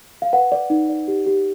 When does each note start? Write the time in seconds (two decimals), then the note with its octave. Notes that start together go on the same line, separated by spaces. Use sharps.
0.22 F5
0.33 B4 F#5
0.52 D5
0.70 D#4
0.89 D5
1.08 G4
1.26 G4